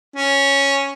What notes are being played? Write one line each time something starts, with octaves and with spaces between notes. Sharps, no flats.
C#4